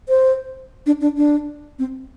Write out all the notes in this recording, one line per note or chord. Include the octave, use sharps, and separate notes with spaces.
C5
D4
D4
D4
C4